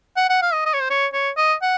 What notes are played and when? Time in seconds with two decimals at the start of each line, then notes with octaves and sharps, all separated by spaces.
0.17 F#5
0.29 F#5
0.42 F5
0.53 D#5
0.65 D#5
0.74 C#5
0.81 C5
0.90 C#5
1.13 C#5
1.37 D#5
1.62 F#5